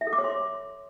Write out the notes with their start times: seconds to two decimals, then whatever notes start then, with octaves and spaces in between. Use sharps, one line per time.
0.01 E5
0.07 A4
0.13 D6
0.18 C#5
0.24 C6